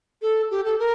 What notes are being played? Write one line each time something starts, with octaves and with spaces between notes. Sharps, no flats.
A4
G4
A4
A#4